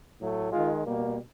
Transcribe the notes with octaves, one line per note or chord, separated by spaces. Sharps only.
A2 F#3 A3
D#3 G#3 F4
B2 G3 A#3